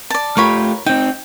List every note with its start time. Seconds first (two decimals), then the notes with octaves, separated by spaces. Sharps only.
0.10 D5 A5
0.37 A3 F4 G4 A#4 C#5 B5
0.86 C4 D#4 G5